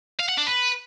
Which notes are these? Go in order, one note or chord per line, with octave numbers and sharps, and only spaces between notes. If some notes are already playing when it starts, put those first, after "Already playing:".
F5
F#5
D4
B4